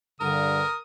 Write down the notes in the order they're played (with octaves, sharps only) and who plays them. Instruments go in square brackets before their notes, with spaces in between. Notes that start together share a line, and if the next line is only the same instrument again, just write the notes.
[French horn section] G2 [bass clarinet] D3 [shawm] A#4 [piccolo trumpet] D#6